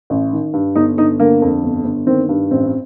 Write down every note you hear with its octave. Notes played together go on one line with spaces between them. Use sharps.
A1
D#3
G2
G1 D#4
G1 D#4
D3 A#3
F2
G1
G1
D#3 C4
G2
A1 C4